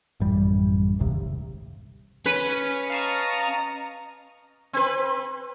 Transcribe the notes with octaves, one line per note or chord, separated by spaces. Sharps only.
A1 F#2 G3
D1 G#1 D#2 C3
C#4 B4
D#5 F5 A5 A#5 C#6
C4 B4